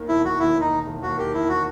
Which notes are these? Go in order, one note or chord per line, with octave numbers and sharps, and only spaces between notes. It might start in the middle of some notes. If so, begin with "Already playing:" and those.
Already playing: D#2 D#3
E1 E4
E1 F#4
D#2 E4
D#3 D#4
E1
E1
D#2 F#4
D#3 G4
E1 E4
F#4